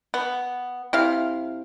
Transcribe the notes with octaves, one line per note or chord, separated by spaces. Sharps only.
B3
C3 E4 F5